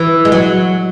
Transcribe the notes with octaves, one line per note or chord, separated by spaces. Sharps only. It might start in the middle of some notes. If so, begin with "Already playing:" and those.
Already playing: E3
G#3
F#3